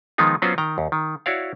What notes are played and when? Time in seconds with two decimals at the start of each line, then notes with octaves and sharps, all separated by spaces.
0.18 D#3 F3 G#3 B3 D#4 F4
0.42 F#3 B3 C#4 F4 F#4 C5
0.58 D#3 G5 A#5
0.78 D#2
0.92 D#3
1.26 E4 F#4 C#5 D5 F5